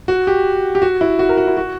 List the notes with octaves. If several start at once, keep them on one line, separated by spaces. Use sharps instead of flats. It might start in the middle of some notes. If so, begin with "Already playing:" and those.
F#4
G4
G4
F#4
E4
F#4
A#4
F#4
E4
F#4